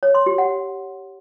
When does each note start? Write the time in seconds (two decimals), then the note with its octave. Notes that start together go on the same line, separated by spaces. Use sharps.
0.03 C#5
0.15 C6
0.26 G4
0.38 F#5